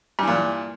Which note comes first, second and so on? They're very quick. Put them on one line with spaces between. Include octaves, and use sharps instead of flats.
G2 E3 A#2